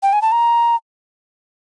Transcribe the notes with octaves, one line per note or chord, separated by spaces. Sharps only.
G5
G#5
A5
A#5